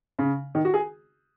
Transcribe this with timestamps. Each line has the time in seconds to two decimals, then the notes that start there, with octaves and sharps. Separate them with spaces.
0.19 C#3
0.55 D#3
0.65 F#4
0.74 G#4